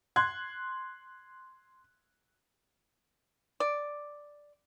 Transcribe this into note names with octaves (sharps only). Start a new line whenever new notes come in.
C6 F#6 G#6
D5